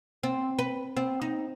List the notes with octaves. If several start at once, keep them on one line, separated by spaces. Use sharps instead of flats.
C4
B4
C4
D#4